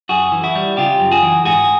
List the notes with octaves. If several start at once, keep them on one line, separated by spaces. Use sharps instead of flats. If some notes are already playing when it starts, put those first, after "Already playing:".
F#2 F#4 G#4
E3
E4 F#4
G3
C#3 F4 G4
F#2
F#4 G#4
E3
G#2 F#4 G#4